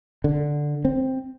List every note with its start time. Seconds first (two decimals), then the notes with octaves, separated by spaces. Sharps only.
0.24 D3
0.85 C4